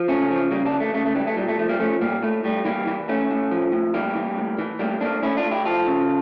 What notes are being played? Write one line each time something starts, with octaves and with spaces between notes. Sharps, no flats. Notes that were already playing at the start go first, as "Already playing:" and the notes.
Already playing: F3
C#3 A3 C#4
F3
C#3 G3 A#3
A#3 D4
E3
A3
C#3 A3
A3
E3 G3
A3
A#2 G3
A3
F3 A3
G3 A#3
F3 A3 C#4
A#2 G3 A#3
A2 A3
A2 G3
E3 G3 A#3
E3
A2 A3 C#4
A2
F3
A2
E3 G3 A#3
E3
A2
E3
A2 G3 A#3
A2 A#3 D4
A2 C#4 E4
D4 F4
A2
E4 G4
F3 F4 A4
C#3